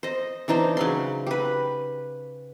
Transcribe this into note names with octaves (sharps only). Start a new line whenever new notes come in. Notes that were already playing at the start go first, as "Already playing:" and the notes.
C5 D#5
E3 D4 D#4 C5
C#3 F#3 C6
G4 B4